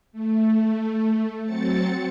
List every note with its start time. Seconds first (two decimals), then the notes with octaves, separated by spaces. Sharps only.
0.12 A3
1.43 F#3 C4 A6 C#7